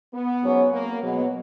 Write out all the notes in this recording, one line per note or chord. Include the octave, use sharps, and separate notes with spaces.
B3
G#2 F#3 C#4 F#4 C#5
A#3
B2 F#3 G#3 B3